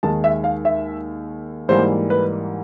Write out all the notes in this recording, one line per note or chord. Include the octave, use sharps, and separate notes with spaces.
D#2 D#3 G#3 A5
E5
F5
E5
G#2 E3 G3 A#3 C5
B4